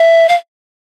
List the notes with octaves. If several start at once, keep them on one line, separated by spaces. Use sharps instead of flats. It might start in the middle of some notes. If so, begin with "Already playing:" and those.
Already playing: E5
F5